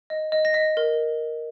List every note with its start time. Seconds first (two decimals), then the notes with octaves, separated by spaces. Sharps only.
0.10 D#5
0.32 D#5
0.45 A#6
0.54 D#5 B6
0.77 A#4